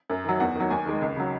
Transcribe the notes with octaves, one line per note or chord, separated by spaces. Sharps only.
F#2
D#3 F#3
E2 F#5
D#3 F#3
D#2 G#5
D#3 G#3
C#2
C#3 F#3